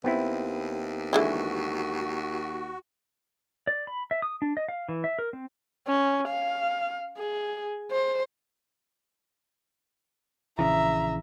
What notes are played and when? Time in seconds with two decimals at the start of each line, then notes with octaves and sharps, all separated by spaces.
0.04 D#2 B3 C4 E4
1.13 D3 E3 G#3 F#4
3.67 D5
3.87 B5
4.11 E5
4.22 D#6
4.42 D4
4.57 D#5
4.69 F5
4.89 E3
5.04 E5
5.19 A#4
5.33 C4
5.88 C#4
6.28 F5
7.18 G#4
7.91 C5
10.59 A#1 C#3 E3 E5 A#5